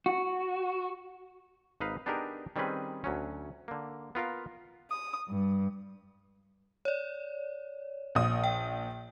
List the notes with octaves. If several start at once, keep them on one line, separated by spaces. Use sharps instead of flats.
F#4
G#1 D#4 B4 F5
B3 D4 D#4 G4 G#4 A#4
D#3 G3 C4 C#4 G#4 B4
D2 F#3 C#4
D3 A#3
B3 F4 A#4 F5
D#6
G2
C#5 D5
A#1 D#6
G5